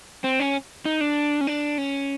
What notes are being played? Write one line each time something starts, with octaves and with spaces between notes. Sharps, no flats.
C4
C#4
D#4
D4
C#4
D4
C#4